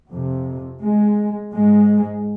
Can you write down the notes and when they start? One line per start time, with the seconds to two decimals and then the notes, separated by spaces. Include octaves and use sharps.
0.10 F2 C3
0.81 G#3
1.53 G#2 G#3